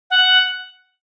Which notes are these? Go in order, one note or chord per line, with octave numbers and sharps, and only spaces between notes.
F#5